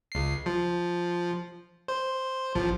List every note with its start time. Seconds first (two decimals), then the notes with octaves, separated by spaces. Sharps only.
0.12 C#2 C7
0.46 F3
1.88 C5
2.55 A1 F3